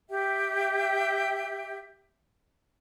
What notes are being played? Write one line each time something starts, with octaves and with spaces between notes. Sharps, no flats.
G4 E5 G5